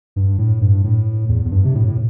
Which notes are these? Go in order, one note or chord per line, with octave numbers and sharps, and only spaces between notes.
G2
A2
G2
A2
E2
E2
G2
C3
A2
A2